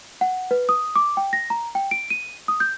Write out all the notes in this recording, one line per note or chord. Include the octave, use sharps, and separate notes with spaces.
F#5
B4
D#6
D6
G5
A#6
A#5
G5
D7
D#7
D#6
G6